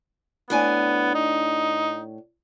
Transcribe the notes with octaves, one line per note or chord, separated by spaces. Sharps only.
A2 B3 D4 G#5
D#4